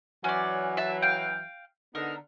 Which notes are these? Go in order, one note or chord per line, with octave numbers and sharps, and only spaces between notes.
E3 F#3 C#4 D5
E5 A5
F5 G5
D3 B3 D#4 A#4